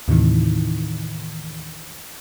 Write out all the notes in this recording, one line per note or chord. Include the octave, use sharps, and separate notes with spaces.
D#2 A2 C3 D#3 E3